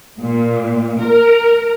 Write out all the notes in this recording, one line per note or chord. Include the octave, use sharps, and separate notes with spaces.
A#2
A#4